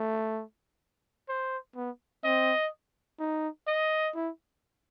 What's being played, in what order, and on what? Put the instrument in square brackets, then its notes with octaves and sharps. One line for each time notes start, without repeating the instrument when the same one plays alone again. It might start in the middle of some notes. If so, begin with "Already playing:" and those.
Already playing: [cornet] A3
[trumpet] C5
[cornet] B3
[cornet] C4 [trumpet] D#5
[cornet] D#4
[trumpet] D#5
[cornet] E4